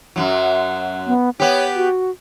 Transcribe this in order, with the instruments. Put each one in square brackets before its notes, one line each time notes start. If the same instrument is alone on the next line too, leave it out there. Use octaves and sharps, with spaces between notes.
[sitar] F#2 A2 F#3
[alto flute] B3
[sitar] B3 G4 [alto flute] C#5
[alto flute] F#4